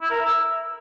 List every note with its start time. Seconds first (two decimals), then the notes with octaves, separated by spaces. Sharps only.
0.01 E4
0.10 A#4
0.20 E5